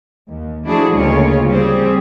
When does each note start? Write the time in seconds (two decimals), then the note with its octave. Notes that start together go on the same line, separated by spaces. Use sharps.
0.29 D#2
0.64 F3 A3 D4 E4 F#4 G#4
0.93 D2 C#3 G#3 A#3 F4 C#5
1.47 G3 C4 G4 G#4